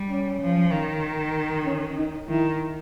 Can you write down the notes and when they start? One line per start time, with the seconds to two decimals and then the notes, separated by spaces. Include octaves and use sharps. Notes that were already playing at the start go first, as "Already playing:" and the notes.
Already playing: G3
0.10 C#4
0.41 F3
0.72 D#3
1.66 C#4
1.97 D#4
2.28 D#3 E4